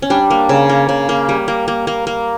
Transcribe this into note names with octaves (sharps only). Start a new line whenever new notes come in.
C#4
G3 D4
A#3
C#3
A#3
C#3
A#3
G3
A#3
A#3
A#3
A#3